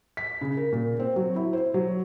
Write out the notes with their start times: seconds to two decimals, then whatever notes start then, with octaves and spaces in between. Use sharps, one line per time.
0.17 B6
0.41 C#3
0.57 A#4
0.72 A#2
1.00 C4
1.16 F#3
1.36 E4
1.53 C5
1.74 F#3